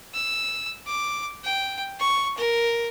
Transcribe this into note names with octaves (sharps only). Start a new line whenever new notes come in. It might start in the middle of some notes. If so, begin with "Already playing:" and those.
E6
D6
G5
C#6
A#4